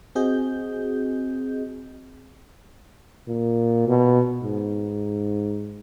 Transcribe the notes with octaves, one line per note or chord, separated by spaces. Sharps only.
C4 F#4 G#4 D#5 G6
A#2
B2
G#2